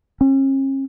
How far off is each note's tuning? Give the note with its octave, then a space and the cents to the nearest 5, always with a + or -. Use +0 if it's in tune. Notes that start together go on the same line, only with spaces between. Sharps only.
C#4 -45